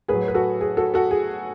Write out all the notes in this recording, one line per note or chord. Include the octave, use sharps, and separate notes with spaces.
A2 F#3 G#4 B4
B4
F#4 A4
G#4
F#4 A4
F#4 A4
G#4